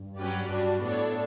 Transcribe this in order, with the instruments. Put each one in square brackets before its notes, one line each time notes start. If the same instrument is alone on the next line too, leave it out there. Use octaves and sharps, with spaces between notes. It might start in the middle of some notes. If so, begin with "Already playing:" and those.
Already playing: [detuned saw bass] G2
[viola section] F#3 C#4 G4 B4 D5
[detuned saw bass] G2 [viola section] G3 D4 F#4
[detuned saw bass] A2 [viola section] B3 D4 A4 C#5